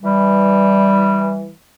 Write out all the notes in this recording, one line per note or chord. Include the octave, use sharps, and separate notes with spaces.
E3 G3